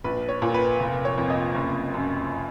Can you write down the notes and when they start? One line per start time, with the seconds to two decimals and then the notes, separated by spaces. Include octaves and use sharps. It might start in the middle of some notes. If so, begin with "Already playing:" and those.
0.04 A#1 B4
0.29 C#5
0.42 A#2
0.54 B4
0.80 F1
1.05 C#5
1.18 F2
1.30 D#5
1.55 F#1
1.94 F#2